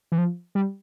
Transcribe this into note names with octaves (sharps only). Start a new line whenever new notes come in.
E3
F3
G3